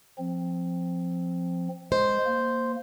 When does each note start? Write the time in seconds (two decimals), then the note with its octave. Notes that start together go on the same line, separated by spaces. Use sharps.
0.18 F3 C4
1.92 G#3 C5
2.26 A#3